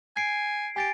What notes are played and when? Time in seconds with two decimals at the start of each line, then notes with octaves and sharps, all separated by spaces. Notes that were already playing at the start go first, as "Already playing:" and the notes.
0.16 G#5 G#6 C7 D7
0.76 G4 G#5 A6 D7